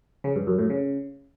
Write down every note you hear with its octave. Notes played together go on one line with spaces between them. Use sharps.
C#3
G2
F#2
A2
C#3